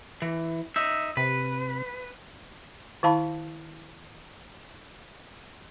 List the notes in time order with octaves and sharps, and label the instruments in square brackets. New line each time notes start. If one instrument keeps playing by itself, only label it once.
[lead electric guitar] E3
D#4 E5
[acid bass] C3 [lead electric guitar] B4
[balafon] D#3 E4 F5 A5 B5